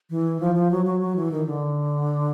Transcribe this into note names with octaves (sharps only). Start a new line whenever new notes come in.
E3
F3
F3
F#3
F#3
F#3
E3
D#3
D3